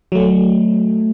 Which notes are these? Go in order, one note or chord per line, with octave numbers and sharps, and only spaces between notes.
F#3 A3